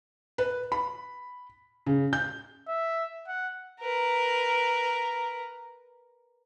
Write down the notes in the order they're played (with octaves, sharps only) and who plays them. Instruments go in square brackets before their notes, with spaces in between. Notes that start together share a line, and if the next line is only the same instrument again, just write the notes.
[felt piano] B4
B5
C#3
G6
[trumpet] E5
F#5
[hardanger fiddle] A#4 B4